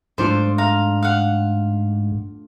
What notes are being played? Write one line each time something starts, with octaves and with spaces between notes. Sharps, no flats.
G#2 A3 D4 F4 C5
F5 A#5
F5 F#5